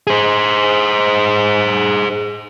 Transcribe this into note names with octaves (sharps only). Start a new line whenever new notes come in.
G#4 C5